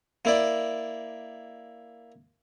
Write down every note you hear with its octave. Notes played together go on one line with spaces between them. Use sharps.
A#3 E4 D5